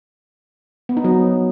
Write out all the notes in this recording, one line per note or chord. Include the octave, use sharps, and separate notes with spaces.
B3
D#4
F#3